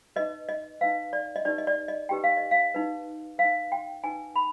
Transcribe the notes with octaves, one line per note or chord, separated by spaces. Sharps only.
D#4 B4 D#5
D#5
D#4 B4 F5
D5
D#5
D#4 G4 B4 D5
D#5
D5
D#5
D#4 G4 B4 G5
F5
D#5
F5
D#4 B4
D#4 B4 F5
G5
D#4 B4 G#5
B5